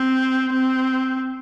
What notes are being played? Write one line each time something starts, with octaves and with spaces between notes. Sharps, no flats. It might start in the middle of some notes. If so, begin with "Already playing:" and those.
Already playing: C4
C4